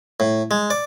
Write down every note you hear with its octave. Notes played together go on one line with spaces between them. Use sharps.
A2
G#3
D5